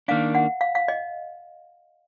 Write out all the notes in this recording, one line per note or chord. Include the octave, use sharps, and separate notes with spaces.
D#3 A#3 D4 F5
F#5
F5
F5
D#5